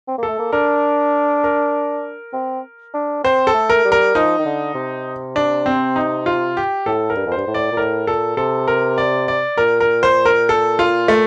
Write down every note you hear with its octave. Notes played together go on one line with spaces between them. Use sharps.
C4
A#3 A4
A3
A#3
D4 A#4
A#4
C4
D4
C4 C5
A4
A3
A#4
G3
A#4
F3 D#4
D#3
D3
C3
D4
C4
D#4
F4
G4
A2 A4
A#4
G2
F2
G2 C5
A2
D5
A#2
A2 A#4
A#2 A4
C3 A4
A#4
D5
D5
A#2 A#4
A#4
C5
A#4
A4
F4
A3